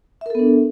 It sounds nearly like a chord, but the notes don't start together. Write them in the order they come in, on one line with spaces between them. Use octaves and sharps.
E5 A#4 A4 B3 D4